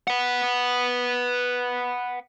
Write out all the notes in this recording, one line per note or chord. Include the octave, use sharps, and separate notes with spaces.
B4 F#5